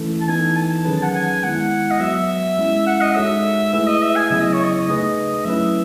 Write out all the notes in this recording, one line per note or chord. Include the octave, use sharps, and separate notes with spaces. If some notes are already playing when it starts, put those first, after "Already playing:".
Already playing: E3 A3 C#4 E4 A4
A5
E3 B3 D#4 A4 G#5
A5
D#3 F#3 C#4 G#4 B4
F#5
G#5
G#3 B3 E4 F#5
D#5
F#3 B3 F#4 E5
E5
G#3 C#4 E4
F#5
D#5
G#3 D#4 F#4 A4 C#5 E5
A3 E4 G#4 B4 E5
D#5
E5
G#5
C#3 F#3 B3 E4 G#4 E5
D#5
C#5
D#5
A3 D#4 G#4 B4 D#5
F#3 A3 C#4 E4 B4 E5